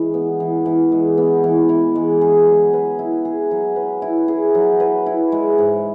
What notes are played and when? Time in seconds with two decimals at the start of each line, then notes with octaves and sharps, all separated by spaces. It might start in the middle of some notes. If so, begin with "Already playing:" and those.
Already playing: E3 G#3
0.14 B3
0.40 E3
0.66 E3
0.92 G#3
1.18 B3
1.44 E3
1.69 E3
1.95 G#3
2.21 G#4
2.47 F#3
2.73 B4
2.99 E4
3.25 G#4
3.51 F#3
3.76 B4
4.02 E4
4.28 G#4
4.55 F#3
4.80 B4
5.06 E4
5.32 G#3
5.58 G#2